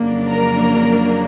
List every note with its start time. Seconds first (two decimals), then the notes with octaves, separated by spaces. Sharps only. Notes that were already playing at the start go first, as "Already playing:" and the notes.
Already playing: F2 C#3 F#3 A#3 D4
0.29 A#4 A#5